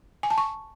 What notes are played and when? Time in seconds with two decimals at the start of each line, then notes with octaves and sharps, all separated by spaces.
0.23 G#5
0.30 A5
0.38 C#6